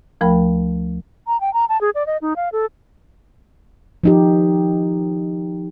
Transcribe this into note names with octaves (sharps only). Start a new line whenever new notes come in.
D2 F3 A3 A#4 G5 B5
A#5
G5
A#5
A5
G#4
D5
D#5
D#4
F5
A4
F3 D#4 G4